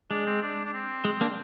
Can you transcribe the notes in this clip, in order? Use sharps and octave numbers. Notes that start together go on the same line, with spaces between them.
G#3 D4
C4
D4
D4
C4
G#3
A#3 D4